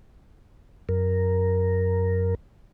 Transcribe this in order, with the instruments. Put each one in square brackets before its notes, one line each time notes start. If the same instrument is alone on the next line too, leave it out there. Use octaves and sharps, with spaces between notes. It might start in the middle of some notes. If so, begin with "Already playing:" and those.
[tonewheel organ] F#2 A#4